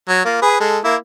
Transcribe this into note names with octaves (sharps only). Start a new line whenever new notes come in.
F#3
A#3 F4
G#4 B4
G#3 A4
A#3 E4